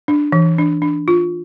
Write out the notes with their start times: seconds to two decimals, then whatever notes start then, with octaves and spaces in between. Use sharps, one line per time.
0.08 D4
0.32 E3
0.58 D4
0.82 D4
1.08 F4